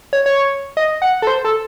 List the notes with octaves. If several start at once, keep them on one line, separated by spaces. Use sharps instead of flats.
C#5
C#5
D#5
F#5
A4
C5
A4